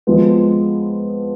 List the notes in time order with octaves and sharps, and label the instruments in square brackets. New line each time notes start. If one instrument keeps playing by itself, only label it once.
[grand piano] F3 G#3 B3